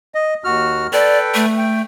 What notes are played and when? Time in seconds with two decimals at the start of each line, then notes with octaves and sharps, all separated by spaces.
0.15 D#5
0.44 D#2 F#4 F6
0.93 A4 B4 D5 G5
1.34 A3
1.58 G5